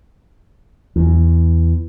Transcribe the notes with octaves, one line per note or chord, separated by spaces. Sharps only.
E2